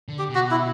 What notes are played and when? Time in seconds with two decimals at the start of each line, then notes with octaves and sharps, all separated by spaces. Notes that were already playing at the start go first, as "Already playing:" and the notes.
0.08 D3
0.19 G4
0.30 B2
0.35 F#4
0.51 E4